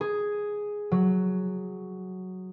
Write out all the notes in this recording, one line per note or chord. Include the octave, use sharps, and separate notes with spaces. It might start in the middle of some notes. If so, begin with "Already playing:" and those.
G#4
F#3